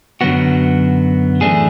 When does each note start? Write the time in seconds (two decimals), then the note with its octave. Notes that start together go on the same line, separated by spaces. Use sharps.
0.21 F#2 D3 F#3 B3 F#4
1.41 A2 E3 A3 D4 G#4